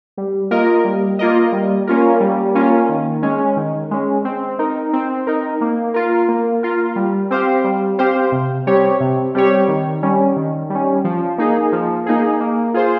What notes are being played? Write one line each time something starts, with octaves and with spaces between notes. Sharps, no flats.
G3
A#3 F4 A#4 D#5
G3
A#3 F4 A#4 D#5
G3
A#3 C#4 F4 A#4
G3
A#3 C#4 F4 A#4
D#3
G#3 C#4
D#3
G#3 C#4
C4
D#4 A#4
C4
D#4 A#4
A#3
F4 A#4
A#3
F4 A#4
G3
C4 G4 C5 F5
G3
C4 G4 C5 F5
C3
G3 C4 G4 C#5
C3
G3 C4 G4 C#5
D#3
G3 C#4
D#3
G3 C#4
F3
A#3 D#4 G#4
F3
A#3 D#4 G#4
A#3
F4 G#4 C5